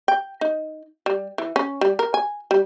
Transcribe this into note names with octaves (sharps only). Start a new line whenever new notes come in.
G5
D#4
G3
E3
C#4
G3
A#4
G#5
G3